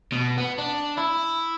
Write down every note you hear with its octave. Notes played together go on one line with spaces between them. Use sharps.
B2
B3
D4
E4